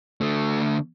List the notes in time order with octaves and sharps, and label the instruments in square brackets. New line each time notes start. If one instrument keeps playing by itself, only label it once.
[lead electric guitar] D3 A3